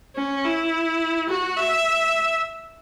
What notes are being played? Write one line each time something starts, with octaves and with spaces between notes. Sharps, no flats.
C#4
E4
F#4
E5